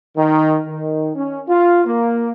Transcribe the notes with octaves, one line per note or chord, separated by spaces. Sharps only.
D#3
D#3
C#4
F4
A#3